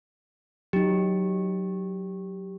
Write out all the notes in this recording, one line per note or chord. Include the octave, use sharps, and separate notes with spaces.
F#3 D#4 G4